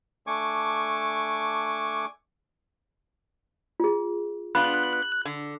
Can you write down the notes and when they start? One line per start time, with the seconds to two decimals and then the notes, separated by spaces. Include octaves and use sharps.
0.27 A3 D4 G#5 C#6 D6
3.80 F4 G#4
4.55 B3 D4 F4 B5 F#6
5.25 D3